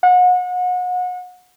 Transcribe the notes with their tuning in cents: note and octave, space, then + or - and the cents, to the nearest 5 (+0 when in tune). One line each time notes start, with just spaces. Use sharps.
F#5 -35